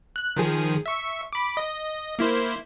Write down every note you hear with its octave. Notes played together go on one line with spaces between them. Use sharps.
F#6
D#3 F3 G#4
E5 C#6
B5 D6
D#5
A#3 E4 C5